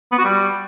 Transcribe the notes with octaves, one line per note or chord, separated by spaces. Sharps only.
B3
F#4
G3